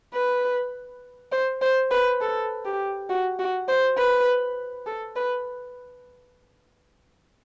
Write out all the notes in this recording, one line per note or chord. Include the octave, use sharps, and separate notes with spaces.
B4
C5
C5
B4
A4
G4
F#4
F#4
C5
B4
A4
B4